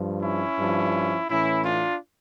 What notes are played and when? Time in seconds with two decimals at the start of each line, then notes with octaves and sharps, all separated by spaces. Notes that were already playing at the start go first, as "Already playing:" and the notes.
Already playing: G2 F3
0.21 C#4 E4
0.57 G2 F3
1.28 A2 E3 C#4 E4
1.64 D4 F4